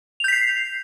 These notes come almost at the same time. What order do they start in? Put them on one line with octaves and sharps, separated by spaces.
F7 G6 B6 C7